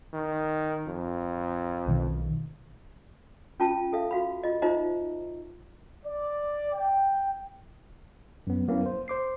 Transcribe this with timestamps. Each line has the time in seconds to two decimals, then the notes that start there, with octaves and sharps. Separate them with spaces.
0.13 D#3
0.87 F2
1.86 B1 B2 D#3
3.60 C#4 F4 A5
3.93 A4 E5 F5
4.11 F#4 F5 B5
4.44 F4 D#5
4.62 D#4 F4 C5 D#5 E5 A#5
6.05 D5
6.73 G5
8.47 F#2 B3
8.68 F#3 A#3 B3 C#4 E4
8.86 C5
9.08 C5 D6 C7